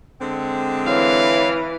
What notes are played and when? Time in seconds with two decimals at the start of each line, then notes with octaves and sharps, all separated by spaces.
0.21 D3 G#3 C4
0.87 E3 C#5 F5